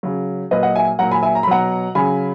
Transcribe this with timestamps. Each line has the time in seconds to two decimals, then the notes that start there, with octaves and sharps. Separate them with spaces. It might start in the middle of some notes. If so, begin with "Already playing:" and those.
0.03 C#3 F#3
0.51 A#2 F#3 B4 D#5
0.63 D#5 F#5
0.75 E5 G#5
0.99 A#2 F#3 F#5 A#5
1.11 G#5 B5
1.23 E5 G#5
1.35 A#5
1.43 B5
1.47 B2 F#3 F#5 A#5
1.95 C#3 F#3 G#5 B5